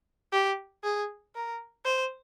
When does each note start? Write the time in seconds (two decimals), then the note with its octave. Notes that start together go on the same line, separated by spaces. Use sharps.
0.33 G4
0.84 G#4
1.35 A#4
1.85 C5